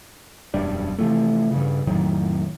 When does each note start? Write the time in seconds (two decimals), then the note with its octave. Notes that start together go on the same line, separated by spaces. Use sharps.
0.54 E1 F#2 G3 D4
0.99 C3 E3 F3 A3
1.51 G2 C#3
1.87 F2 A2 D#3 F#3